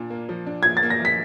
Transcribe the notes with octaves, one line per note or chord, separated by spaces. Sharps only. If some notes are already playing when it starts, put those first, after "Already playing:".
Already playing: A#2 D4
A#3
F3
D4
A#2 G#6
A6
A#3
A#6
F3 B6